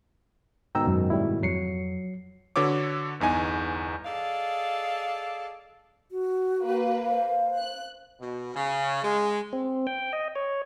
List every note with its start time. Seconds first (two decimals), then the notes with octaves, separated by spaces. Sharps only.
0.75 G#2 B2 D#3 G5 A#5 E6
0.87 F#2
1.10 G3 A3 E4
1.43 F2 F#3 C7 C#7
2.56 D3 F#4 A4 B4 C#5 D6
3.20 G1 E2 D#4 G#5
4.05 G#4 A4 D5 D#5 F5
6.11 F#4
6.61 A#3 B4 F5
7.07 C5
7.57 F#6
8.20 B2
8.55 C#3
9.03 G#3
9.53 C4
9.87 G5
10.13 D#5
10.36 C#5